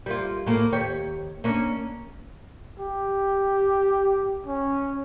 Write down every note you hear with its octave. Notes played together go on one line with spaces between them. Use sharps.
G3 A#3 F4
A2 A#3
D#2 G4 C#5
A#3 C#4 D4
G4
C#4